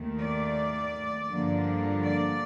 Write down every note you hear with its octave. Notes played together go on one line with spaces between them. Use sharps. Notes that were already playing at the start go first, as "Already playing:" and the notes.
Already playing: D#2 D#3 A3
D5
G2 D3 F3 A#3 D4
D5